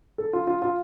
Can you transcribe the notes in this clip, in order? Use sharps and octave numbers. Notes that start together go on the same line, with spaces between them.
A4
F4
F4
F4